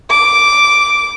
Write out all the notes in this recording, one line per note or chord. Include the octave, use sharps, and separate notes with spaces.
D6